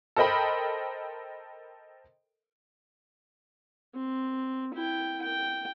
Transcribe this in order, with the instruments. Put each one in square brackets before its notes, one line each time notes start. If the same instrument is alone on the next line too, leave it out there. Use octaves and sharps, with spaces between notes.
[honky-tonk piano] A4 A#4 C5 D#5 G5 B5
[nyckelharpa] C4
E4 G5
G5